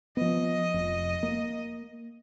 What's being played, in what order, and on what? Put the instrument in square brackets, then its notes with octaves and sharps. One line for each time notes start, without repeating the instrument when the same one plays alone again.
[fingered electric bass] F3 B3 [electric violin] D#5
[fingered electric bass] F1
A#3